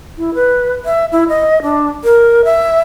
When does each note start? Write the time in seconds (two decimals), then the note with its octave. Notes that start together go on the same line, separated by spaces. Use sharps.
0.17 E4
0.35 B4
0.85 E5
1.12 E4
1.29 D#5
1.63 D4
2.04 A#4
2.45 E5